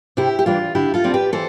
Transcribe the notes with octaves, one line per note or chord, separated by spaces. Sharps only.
C3 E4 G4
G4
E3 G3 D4 F4
D3 E4 G4
F4 A4
G3 C4
G4 B4
E3 A4 C5